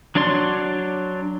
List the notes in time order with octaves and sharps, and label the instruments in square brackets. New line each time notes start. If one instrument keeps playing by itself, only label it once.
[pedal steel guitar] F#3 D4 C#5 D5 C6